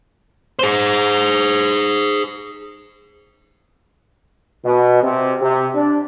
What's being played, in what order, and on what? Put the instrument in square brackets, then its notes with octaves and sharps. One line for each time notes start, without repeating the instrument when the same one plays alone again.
[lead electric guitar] G#4 C5
[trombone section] B2
C3
C3
D4